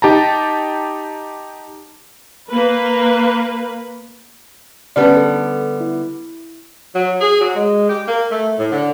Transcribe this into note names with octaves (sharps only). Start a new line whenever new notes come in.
D#4 G4 A5 A#5
A#3 B4
D3 G3 B3 C#4 B4 D5
A4
E4
F#3
G#4
F#3
G#3
G4
A#3
A3
A2
D3